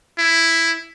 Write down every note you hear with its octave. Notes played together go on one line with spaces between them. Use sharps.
E4